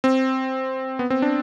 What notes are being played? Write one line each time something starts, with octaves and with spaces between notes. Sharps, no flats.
C4
B3
C4
D4